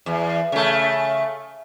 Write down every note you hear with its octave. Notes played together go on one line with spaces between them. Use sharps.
E2
C#3 A3